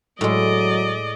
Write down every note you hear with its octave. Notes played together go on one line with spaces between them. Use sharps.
A2 F#3 G#3 D5 D#5